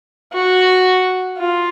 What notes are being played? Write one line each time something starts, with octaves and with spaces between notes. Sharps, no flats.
F#4
F4